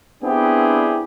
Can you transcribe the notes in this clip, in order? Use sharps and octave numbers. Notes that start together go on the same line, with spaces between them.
B3 C4 D4 E4 G4 G#4